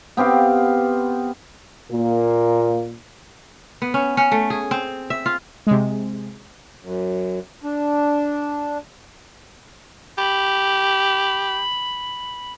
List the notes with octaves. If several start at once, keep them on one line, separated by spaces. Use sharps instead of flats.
B3 C4 G4 F5
A#2 A#3
B3
C#4
C#4
A3
G#4
C4
E5
F4
C3 G#3
F#2
D4
G4 B5